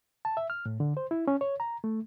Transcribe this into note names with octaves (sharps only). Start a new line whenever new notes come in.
A5
E5
F6
A2
D3
C5
E4
C#4
C#5
A#5
A3